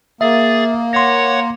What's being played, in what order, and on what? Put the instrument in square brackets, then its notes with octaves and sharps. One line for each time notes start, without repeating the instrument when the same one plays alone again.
[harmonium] A#3 [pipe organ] G#4 A6 [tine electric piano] E5
[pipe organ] C#5 F#5 [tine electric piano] C6 A#6